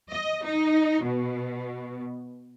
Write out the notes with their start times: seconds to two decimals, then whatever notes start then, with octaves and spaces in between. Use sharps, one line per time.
0.10 D#5
0.45 D#4
1.03 B2